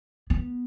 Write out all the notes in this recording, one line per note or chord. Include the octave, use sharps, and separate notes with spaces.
B3